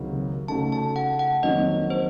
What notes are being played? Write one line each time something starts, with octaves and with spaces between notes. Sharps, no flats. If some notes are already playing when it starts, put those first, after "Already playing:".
Already playing: C#2 C3 D#3 F#3 A#3
C#3 A3 D#4 F#4 A5
A5
F#5
F#5
F2 D#3 F#3 A#3 D#5
C5